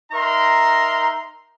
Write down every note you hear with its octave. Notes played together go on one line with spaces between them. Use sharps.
D#4 A#4 E5 A#5 C6